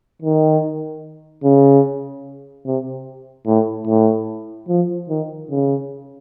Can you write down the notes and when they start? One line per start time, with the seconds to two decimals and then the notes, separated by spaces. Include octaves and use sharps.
0.22 D#3
1.44 C#3
2.66 C3
3.47 A2
3.87 A2
4.68 F3
5.09 D#3
5.50 C#3